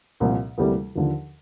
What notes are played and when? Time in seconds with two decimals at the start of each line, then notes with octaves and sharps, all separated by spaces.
0.20 C2 A#2 F3
0.58 D2 C3 E3 G3 A#3
0.96 D#2 D3 F3